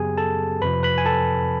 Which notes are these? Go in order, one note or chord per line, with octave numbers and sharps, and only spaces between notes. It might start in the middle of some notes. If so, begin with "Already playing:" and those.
Already playing: F#2 C#3 F#3 B3 G4 G#4 G#5
A4 A5
F2 C3 F3 B4 B5
B4 B5
G#5
A4 A5